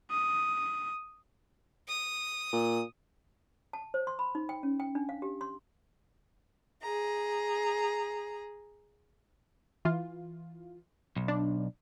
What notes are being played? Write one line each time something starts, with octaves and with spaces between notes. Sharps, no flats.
D#6
D#6
A#2
A5
C5
C6
B5
D#4
G5
C#4
G5
D4
F5
G4
C6
G#4 A#5
E3 F4
B1
D4